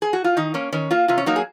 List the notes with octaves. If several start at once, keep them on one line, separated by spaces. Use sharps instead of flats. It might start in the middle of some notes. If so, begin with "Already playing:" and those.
G#4
F#4
F4
D#3 D#4
A#3 C#4
D#3 C#4
A#3 F4
C3 F4
C#4
F#3 A#3 D#4
G#4